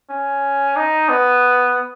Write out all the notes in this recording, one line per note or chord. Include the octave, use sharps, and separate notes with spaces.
C#4
D#4
B3